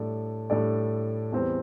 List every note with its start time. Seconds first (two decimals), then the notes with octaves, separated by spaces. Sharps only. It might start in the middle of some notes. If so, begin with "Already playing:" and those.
Already playing: A2 G3 D4 A4 D5
0.50 A2 G3 D4 A4 D5
1.32 E2 E3 G3 C4